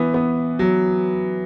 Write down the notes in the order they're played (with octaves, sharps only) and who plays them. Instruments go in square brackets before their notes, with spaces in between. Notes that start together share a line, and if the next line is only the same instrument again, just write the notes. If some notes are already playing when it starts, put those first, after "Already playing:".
Already playing: [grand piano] E3 B3
B3
F#3